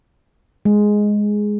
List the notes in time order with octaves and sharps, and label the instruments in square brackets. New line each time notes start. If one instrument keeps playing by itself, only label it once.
[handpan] G#3